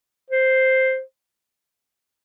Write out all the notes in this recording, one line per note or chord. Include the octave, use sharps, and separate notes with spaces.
C5